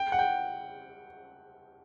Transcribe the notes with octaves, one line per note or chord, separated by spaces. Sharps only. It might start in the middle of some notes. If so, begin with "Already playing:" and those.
Already playing: G5
F#5
G5